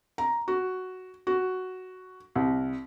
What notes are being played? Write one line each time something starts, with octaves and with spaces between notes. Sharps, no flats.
A#5
F#4
F#4
C2